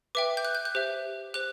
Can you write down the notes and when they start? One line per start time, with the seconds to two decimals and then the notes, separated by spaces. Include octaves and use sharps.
0.15 B4 E5 G5 D6
0.37 G6
0.45 F#6
0.55 G6
0.65 F#6
0.75 G4 C5 E5
1.34 G4 C5 F#6